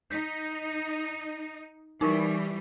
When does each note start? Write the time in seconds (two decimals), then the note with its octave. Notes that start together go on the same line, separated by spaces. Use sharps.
0.11 D#4 G6 B6
2.01 E3 G3 D#4 A#4 C#6